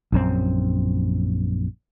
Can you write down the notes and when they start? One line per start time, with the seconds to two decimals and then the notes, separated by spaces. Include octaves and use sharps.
0.12 A#1 F#2 C4